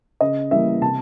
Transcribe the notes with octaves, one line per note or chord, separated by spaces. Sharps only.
C#3 D#5
E3 G3 A#3 E5
C3 A5